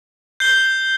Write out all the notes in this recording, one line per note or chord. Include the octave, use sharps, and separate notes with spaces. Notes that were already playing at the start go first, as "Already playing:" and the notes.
G6 C7 G7